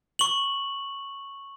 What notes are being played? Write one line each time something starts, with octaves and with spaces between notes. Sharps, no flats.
C#6 F#7